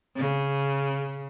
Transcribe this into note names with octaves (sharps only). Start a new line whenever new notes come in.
C#3